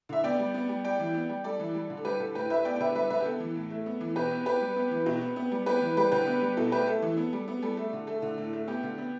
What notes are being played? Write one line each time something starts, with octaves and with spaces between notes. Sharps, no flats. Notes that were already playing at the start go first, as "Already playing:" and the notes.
D3 E5
B3 D5 G5
G3
B3
G3
G3 D5 G5
E3
B3
G3
G3 A4 D5
E3
G3
D3
A4
G3 G4 B4
D3 A4
A2 G4 B4
A3 B4 E5
B3 D5 G5
G5
D3 B4 E5
G3 B4 E5
D3 B4 E5
G4
B3 A4
E3
A2
A3
B3
E3
B2 G4 B4
B3
B3 G4 B4
G3
B3
E3
B2
B3
B3
G3
B3 G4 B4
E3
G3 G4 B4
D3 G4 B4
B3
G3
B2 A4
A3 G4 B4
A3 A4
E3
B3
G3
B3
G3 A4
A3
D3
A3 A4
D3
A2
A3
B3 G4
D3
B3